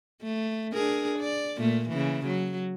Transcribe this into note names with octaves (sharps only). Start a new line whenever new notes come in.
A3
D4 G#4 A#4
D5
A#2 A3 A#3
C#3 E3
F#3